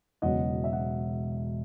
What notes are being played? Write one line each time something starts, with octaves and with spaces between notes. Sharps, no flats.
E1 E2 C#3 F#3 D#5 F#5
E5
F#5